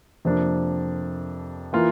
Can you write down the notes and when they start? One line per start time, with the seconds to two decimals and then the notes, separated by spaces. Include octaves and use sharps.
0.25 F2 C3 F3 A#3 D4
1.73 E3 A#3 F4